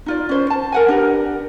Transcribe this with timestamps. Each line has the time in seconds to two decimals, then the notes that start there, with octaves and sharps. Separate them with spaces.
0.06 D#4 F4 D5
0.29 C#4 C5
0.50 A5
0.72 A#4 F#5 G#5
0.88 D4 G4 A#4 B4